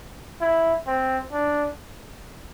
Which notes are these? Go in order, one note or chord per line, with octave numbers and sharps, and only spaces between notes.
E4
C4
D4